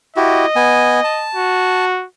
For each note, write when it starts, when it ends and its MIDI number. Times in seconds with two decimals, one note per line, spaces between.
0.16 0.46 64
0.16 0.46 66
0.16 0.46 67
0.16 1.28 75
0.56 1.00 59
0.56 1.00 80
1.04 1.85 81
1.35 2.05 66